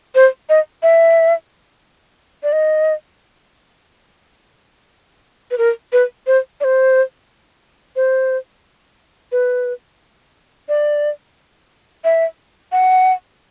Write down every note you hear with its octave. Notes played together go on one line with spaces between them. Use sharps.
C5
D#5
E5
D5
D#5
B4
A#4
B4
C5
D5
C5
C5
B4
D5
E5
F#5